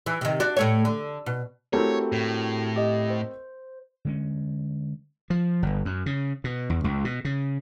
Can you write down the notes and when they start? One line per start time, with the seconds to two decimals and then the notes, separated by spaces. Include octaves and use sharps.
0.06 E3
0.21 C3 D#3
0.40 D4 F#4 D5
0.57 A2 A3 C#5
0.85 D3
1.26 B2
1.73 A3 C4 E4 F#4 G4 A#4 C#5
2.12 A2
2.76 G4 D#5
3.10 C5
4.05 D3 G#3 C#4
5.30 F3
5.63 G1
5.85 F#2
6.06 C#3
6.44 B2
6.70 E2
6.84 C#2
7.05 B2
7.25 C#3